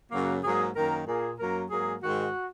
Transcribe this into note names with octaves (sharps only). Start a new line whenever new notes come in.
F#2 C#3 F#3 A#3 F#4
G#2 F#3 A#3 G#4
F#2 D#3 A#3 A#4
A#2 A#3 G#4
F#2 F#3 A#3 A#4
G#2 F#3 A#3 G#4
G#2 D#3 G#3 F#4